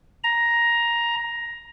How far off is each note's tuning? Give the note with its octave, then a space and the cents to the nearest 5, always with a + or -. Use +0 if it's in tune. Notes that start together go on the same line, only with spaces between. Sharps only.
A#5 +10